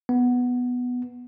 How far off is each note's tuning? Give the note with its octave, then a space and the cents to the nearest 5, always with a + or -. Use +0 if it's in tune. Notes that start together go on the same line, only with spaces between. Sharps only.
B3 +0